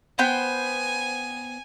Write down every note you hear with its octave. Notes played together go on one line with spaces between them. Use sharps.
B3 C5 G5 G#5